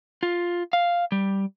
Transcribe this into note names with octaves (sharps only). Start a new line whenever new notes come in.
F4
F5
G3